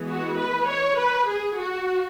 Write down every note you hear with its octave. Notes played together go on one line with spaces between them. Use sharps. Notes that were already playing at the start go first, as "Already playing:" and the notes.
Already playing: E3 G#3 B3
F#4
B4
C#5
B4
G#4
F#4